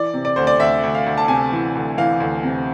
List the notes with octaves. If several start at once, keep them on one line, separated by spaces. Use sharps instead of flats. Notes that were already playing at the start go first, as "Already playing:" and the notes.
Already playing: E3 D5
C3
D5
D2 C5
D5
D2 E5
D2
F5
D2
A5
C3 G#5
E3
D2
E3 F5
D2
C3